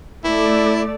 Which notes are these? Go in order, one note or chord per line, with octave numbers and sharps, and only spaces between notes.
A3 E4 D5